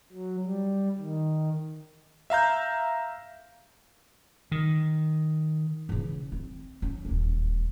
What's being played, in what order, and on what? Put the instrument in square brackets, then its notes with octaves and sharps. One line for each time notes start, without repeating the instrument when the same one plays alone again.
[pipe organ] F#3
G3
D#3
[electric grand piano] E5 F5 A#5 G6
[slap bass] D#3
[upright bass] C#3 E3
C4
C#4
D#1 D2